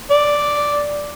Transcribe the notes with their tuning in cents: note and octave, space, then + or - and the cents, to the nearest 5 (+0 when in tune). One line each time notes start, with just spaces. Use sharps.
D5 +0